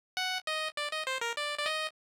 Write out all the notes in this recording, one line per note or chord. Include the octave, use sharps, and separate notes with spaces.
F#5
D#5
D5
D#5
C5
A#4
D5
D5
D#5